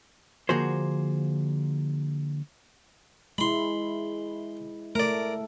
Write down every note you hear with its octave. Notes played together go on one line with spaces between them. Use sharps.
D3 F3 A#3 F#4 G#4 C5
G#3 E4 B5 C6
A3 A#4 D5